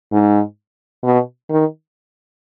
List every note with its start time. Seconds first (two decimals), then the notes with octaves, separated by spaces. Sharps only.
0.13 G#2
1.04 B2
1.50 D#3